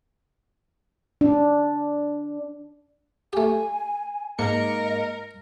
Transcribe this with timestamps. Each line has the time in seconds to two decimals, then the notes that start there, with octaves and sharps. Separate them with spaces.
1.21 D4
3.33 A3 G4 G#5
4.39 G#2 A#3 A#4 D#5 C#7